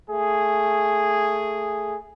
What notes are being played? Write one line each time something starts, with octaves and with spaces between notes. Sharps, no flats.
A3 G#4